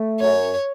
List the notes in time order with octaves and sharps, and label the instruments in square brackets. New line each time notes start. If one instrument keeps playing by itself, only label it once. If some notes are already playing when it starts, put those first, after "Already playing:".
Already playing: [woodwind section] A3
[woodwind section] F#2 [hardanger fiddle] C#5